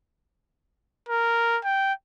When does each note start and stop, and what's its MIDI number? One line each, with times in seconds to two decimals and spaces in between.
1.08 1.59 70
1.64 1.93 79